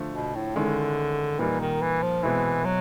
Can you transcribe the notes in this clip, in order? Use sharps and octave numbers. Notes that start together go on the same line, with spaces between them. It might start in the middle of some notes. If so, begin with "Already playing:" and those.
Already playing: D3 F3 A3
B2
A2
D3 D#3 G#3 C#4 E4
A#2 E3 G3 A#3 D#4
D#3
E3
F3
B2 E3 G#3 C4 E4
F#3